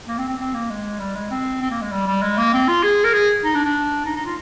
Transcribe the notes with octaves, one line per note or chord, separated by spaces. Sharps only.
A#3
C4
C4
C4
A#3
G#3
G3
G#3
C4
C4
A#3
G#3
G3
G3
G#3
A#3
C4
F4
G#4
A#4
G#4
D#4
D4
D4
D#4
D#4
F4